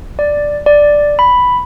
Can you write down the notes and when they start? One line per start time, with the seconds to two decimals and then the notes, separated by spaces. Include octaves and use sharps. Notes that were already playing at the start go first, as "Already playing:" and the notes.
0.19 D5
0.66 D5
1.19 B5